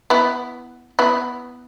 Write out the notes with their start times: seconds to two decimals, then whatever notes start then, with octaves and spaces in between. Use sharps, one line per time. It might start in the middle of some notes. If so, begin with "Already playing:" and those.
0.10 B3 E4
0.99 B3 E4